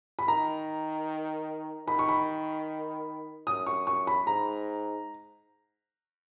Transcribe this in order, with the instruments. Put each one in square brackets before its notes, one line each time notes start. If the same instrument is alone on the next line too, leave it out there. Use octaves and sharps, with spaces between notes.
[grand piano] B5
[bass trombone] D#3 [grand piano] A#5
[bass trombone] D#3 [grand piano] B5
[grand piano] C#6
B5
[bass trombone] F#2 [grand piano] D#6
[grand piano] C#6
C#6
B5
[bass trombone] G#2 [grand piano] A#5